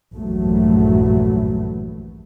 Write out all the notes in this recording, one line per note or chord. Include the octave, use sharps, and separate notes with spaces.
A#1 E2 G2 F#3 A3